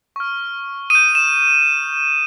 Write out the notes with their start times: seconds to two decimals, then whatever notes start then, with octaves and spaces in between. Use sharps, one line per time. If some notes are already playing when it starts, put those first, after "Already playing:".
0.16 C#6 F6
0.90 D#6 G6 D#7
1.15 E7